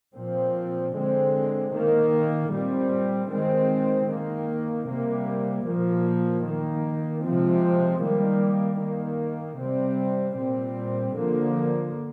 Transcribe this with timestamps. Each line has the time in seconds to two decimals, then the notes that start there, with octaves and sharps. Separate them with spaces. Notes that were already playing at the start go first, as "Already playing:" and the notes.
0.15 A#2 F3 C4
0.94 D3 G#3 C4
1.72 D#3 A#3
2.51 A#2 G3 C4
3.30 D#3 G#3 C4
4.08 D#3
4.13 A#3
4.87 C3 G3 A#3
5.65 A#2 F3 A#3
6.44 D#3 A#3
7.23 C3 F3 G#3 C4
8.02 D#3 G3 A#3
8.80 D#3 A#3
9.59 C3 G3 C4
10.37 A#2 G3 C4
11.16 D3 F3 A#3